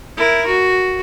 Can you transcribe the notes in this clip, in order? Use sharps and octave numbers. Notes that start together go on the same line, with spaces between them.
E4 A#4
F#4